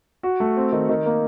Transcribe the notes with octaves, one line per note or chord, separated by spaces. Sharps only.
F#4
A3
C4
D#3
D#3
A#3